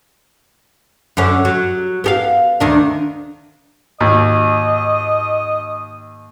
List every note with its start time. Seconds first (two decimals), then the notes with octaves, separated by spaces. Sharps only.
1.17 F#2 D3 C#4
1.45 F#3
2.04 B3 G4 F5
2.60 D2 D#3 D4
4.01 D#2 G#2 D#5